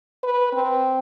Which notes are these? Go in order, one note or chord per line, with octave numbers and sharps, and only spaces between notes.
B4
C4